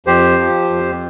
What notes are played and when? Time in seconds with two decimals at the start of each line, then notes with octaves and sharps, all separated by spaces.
0.06 F2 G4 C5
0.38 F3
0.69 F2